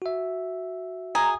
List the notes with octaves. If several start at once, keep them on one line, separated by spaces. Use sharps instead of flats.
F#4 E5
G#4 A#5